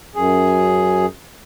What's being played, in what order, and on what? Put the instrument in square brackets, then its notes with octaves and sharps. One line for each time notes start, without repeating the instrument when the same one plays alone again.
[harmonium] F#2 G#4